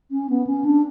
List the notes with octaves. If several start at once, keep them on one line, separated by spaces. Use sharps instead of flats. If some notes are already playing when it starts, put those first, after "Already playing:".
C#4
B3
C#4
D4